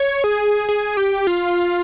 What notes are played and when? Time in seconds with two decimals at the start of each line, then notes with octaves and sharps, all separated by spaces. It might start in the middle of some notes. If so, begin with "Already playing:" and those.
Already playing: C#5
0.24 G#4
0.69 G#4
0.97 G4
1.27 F4